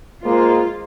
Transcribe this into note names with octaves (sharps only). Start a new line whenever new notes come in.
G#3 A#3 F4 C5